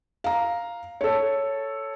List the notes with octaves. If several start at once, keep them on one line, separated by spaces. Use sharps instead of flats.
F5 A#5
A4 C#5